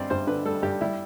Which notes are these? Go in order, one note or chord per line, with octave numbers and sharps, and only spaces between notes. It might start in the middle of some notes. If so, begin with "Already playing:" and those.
Already playing: G2 C4 D5
G2 C5
D3 B4
G3 A4
G2 G4
G3 E4